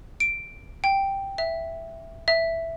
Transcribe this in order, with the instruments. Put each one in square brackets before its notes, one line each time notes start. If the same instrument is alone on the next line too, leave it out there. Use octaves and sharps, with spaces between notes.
[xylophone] D7
G5
E5
E5